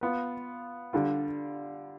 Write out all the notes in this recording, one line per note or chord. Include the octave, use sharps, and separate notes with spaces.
B3 F4 B4
D3 G3 D4 F4